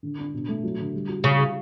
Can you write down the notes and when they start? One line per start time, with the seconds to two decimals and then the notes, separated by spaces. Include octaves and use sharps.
0.03 D3
0.19 D4
0.34 B2
0.48 A3
0.64 F#3
0.79 D3
0.94 G3
1.09 F#4
1.24 C#3 G3
1.39 E4